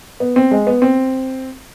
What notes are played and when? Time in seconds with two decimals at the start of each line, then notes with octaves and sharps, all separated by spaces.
0.20 B3
0.36 C4
0.51 G#3
0.67 B3
0.82 C4